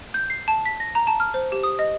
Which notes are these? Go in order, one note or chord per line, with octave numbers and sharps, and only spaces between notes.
G6
C7
A5
B6
A#6
A#5
A5
F6
C5
G4
D#6
D#5